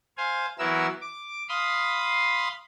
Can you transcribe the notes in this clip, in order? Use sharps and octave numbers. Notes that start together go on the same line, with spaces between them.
C5 F5 G#5
E3 F#3 B3 E4 A#4 E6
D6
F5 B5 C6 D#6